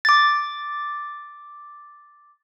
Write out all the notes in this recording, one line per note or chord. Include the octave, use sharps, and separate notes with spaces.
D6 A6